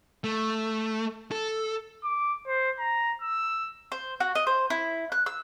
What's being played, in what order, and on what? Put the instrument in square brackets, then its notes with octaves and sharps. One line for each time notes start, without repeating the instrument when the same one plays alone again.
[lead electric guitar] A3
A4
[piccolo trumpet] D6
C5
A#5
E6
[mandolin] C5
F#4
D#5
C5
E4
F#6
E6